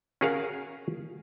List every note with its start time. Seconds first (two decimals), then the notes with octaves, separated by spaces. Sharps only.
0.21 C#4 F#4 G#4 A#4 F5